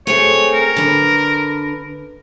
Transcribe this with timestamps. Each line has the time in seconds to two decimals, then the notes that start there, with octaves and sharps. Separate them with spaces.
0.07 A3 C4 G#4 C#5
0.54 A#4
0.76 D3 B4